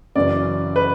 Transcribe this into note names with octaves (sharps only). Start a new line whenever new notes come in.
F#2 C#3 E3 D5
B4